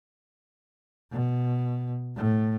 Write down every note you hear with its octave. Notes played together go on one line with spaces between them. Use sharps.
B2
A2